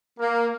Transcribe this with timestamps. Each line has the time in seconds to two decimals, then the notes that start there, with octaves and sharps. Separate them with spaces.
0.19 A#3